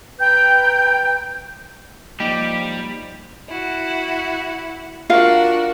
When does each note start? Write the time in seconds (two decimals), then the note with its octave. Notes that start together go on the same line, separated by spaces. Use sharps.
0.20 B4 G5 A#5 G6
2.20 F3 G3 A#3 D#4 G4 D#5
3.47 E4 F#4
5.10 D4 F4 F#4 A#4 F5